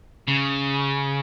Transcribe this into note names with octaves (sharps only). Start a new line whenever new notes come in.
C#3